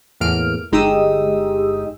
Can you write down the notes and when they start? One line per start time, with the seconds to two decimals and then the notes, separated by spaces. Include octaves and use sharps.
0.21 E2 A2 A#3 F6 D7
0.72 G1 G#3 D#4 G4 D#6 E6